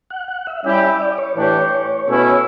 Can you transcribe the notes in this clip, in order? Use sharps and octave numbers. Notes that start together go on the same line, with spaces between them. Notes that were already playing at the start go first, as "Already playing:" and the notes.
F#5
F#5
E5
G3 C#4 E4 G4 E5
E5
D5
C#5
A2 E3 A3 D4 G4 C#5
B2 A3 C#4 E4